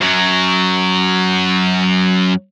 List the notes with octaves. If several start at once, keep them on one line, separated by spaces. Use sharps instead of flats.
F#2 F#3